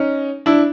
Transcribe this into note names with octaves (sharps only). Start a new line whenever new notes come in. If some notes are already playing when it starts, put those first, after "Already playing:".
Already playing: C#4 D#4
D4 E4